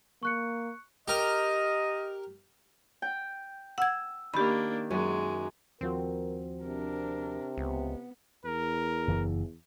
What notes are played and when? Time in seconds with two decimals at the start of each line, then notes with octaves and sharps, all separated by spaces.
0.23 A#3 C#6 F#6 C#7
1.08 G4 A#4 D#5
3.02 G5
3.78 F#5 E6 G#6
4.34 D#3 A#3 D4 G4 B5
4.90 F#2 G#3
5.81 D#2 F3 C4 F#4 A#4
6.64 C3 D4 A#4
7.58 C#2 B3
8.45 E2 A#4
9.08 F#1 E3